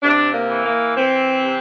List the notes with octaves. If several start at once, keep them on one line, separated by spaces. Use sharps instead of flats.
C3 D4
A#3
E3
A#3
E3 C4
C3